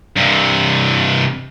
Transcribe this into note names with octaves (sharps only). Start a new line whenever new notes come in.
G2 C3